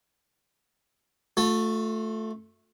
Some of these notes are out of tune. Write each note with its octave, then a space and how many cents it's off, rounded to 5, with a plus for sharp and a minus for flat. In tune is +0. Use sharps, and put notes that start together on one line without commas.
A3 +0 F4 +40